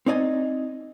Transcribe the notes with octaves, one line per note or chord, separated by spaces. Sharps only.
C4 D#4 D5 D#5 G#5